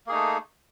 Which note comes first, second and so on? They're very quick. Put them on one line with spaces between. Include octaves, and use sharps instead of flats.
A#3 G#4 D#4 A3